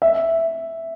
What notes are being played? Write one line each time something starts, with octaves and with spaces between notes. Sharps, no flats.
E5